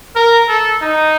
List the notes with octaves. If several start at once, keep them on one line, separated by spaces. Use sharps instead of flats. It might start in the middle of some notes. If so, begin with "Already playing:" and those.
A#4
A4
D#4